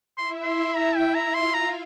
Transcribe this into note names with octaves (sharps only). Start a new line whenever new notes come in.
E4 E5 C6
C6
E4 E5 A#5
G5
E4 E5
A#5
F4 F5 C6
A#5